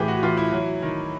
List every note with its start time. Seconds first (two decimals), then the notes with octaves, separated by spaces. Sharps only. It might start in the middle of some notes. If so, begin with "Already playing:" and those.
Already playing: A2 E3 A3 G4 G#4
0.08 F#4
0.23 E3 F4
0.37 E4
0.52 F#3
0.82 D#3